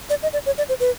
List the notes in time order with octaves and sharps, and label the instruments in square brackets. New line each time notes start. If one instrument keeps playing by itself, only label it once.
[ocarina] D5
D#5
D5
C#5
D5
C5
B4